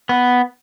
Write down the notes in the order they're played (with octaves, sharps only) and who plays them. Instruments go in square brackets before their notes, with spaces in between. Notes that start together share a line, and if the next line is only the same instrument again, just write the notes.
[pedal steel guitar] B3